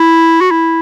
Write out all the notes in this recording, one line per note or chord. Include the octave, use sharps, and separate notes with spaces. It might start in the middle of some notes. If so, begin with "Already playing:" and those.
Already playing: E4
F#4
E4